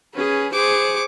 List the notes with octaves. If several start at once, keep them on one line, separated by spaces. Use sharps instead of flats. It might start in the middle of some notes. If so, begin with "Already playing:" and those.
C#4 G#4 B4
G#4 C5 C#6 D6